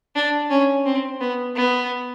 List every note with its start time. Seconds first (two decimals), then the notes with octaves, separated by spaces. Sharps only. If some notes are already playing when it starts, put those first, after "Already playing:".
0.15 D4
0.50 C#4
0.86 C4
1.21 B3
1.56 B3